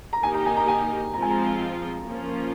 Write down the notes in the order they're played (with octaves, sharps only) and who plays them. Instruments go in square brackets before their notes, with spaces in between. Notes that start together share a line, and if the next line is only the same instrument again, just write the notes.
[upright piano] A#5
[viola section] D#3 A#3 D#4 G4 [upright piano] G#5
[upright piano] A#5
G#5
A#5
G#5
[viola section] F3 G#3 C4 F4 [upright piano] A#5
[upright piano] G#5
A#5
[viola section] F3 A#3 C#4 F4